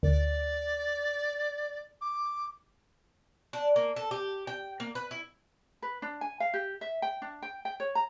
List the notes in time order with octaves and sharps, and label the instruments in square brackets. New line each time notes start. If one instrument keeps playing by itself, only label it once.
[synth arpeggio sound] D2 [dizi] D5
[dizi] D6
[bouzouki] D4
A#3
A4
G4
G5
A#3
B4
E4
[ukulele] B4
D4
G#5
F5
G4
E5
G5
D4
G5
G5
C#5
A#5